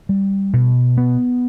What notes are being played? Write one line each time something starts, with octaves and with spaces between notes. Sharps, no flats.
G3
B2
B3